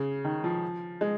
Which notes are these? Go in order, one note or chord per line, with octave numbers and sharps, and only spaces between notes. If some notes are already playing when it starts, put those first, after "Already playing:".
Already playing: C#3
D#3
F3
G#3